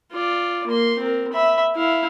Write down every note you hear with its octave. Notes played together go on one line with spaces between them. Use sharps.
F4 D5
A#3 C6
C4 A#4
E5 B5
E4 F5